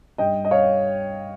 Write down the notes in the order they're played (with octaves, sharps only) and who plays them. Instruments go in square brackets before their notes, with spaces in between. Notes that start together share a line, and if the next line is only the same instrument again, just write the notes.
[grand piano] G2 G3 D#5 G5
D#5
C#5 F5